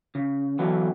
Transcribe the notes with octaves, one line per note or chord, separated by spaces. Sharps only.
C#3
D3 E3 F#3 B3